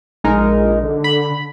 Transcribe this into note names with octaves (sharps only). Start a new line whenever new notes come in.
A#1 G#3 D#4 A#4
D3
B5